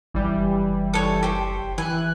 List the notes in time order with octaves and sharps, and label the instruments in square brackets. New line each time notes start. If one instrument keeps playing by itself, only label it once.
[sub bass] F#1 [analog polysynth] E3 G3
[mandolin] A4 C#5
G4 C5
[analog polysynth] E3 F#6 [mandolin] G#5